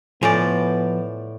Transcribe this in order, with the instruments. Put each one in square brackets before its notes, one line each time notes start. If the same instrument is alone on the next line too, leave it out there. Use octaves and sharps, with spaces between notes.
[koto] A2 C5 D5 [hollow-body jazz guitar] F3 [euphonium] B3 [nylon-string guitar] G#5